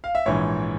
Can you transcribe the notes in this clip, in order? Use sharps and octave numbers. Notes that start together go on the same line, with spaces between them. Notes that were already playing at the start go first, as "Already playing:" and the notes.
F5
E5
A#1 G#2 E3 C#5